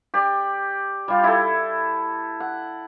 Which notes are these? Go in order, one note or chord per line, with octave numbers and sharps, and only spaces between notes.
G4 D5
G3 F4
E4 A4
F#5